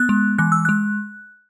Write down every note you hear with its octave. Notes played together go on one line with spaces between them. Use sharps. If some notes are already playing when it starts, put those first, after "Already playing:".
Already playing: B3 F#6
G#3
E3 F#6
E6
G#3 F#6